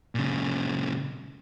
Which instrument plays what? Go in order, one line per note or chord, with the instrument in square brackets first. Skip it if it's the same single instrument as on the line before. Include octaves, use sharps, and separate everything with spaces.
[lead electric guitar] A#2 C#3